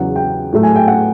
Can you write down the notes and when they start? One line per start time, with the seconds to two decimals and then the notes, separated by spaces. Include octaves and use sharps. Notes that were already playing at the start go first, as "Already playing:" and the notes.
Already playing: E2 C#3 F#3 F#5
0.16 G5
0.52 A2 F#3 A3
0.63 G#5
0.76 G5
0.88 F#5